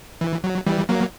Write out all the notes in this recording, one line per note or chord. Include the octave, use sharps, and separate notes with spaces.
E3
F#3
E3 G3
F#3 A#3